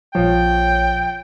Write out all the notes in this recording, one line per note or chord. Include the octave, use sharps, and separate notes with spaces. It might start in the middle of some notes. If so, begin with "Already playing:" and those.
A#1 F3 C#5 G5